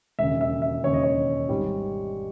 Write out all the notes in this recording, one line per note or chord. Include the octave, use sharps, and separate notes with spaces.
E1 D#2 C#3 E5
E5
E5
E1 D#2 C#3 C#5
D#5
C#5
G#1 G#2 G3